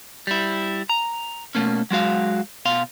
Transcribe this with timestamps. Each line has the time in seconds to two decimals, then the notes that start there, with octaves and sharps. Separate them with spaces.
0.27 G3 E4
0.89 A#5
1.55 B2 A3 A#3 C#4
1.91 F#3 G#3 F#4 F5
2.65 B2 F5 C6